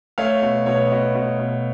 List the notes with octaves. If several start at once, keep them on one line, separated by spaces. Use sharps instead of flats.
A3 C#5 F5
B2
B2 C#5
B2
B2
B2